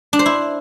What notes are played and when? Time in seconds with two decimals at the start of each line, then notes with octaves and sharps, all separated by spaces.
0.13 D4
0.19 C5
0.26 E4